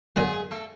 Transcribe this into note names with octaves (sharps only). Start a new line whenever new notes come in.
F#2 D3 F#3 G#3 G#4
A3 A4